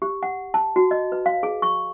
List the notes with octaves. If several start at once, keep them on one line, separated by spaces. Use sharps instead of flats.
G4
F#5
A5
F#4
D#5
B4
F5
G#4
C#6